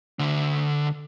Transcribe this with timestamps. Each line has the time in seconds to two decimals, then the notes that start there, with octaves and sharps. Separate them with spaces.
0.19 D2 D3